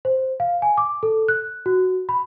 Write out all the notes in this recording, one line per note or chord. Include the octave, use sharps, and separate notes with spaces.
C5
F5
G#5
D6
A4
F#6
F#4
B5